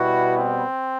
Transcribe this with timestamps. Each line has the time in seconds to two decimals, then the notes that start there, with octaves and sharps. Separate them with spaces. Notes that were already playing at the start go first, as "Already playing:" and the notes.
Already playing: B2 G3 B3 E4 F#4
0.36 C4